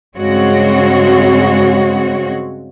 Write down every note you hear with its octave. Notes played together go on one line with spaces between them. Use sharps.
G2 C#3 G#3 C4 F#4 C#5